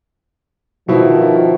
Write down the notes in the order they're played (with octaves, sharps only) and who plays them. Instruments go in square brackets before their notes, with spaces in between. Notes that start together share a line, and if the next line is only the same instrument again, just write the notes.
[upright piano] B2 E4 [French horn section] D#3 F3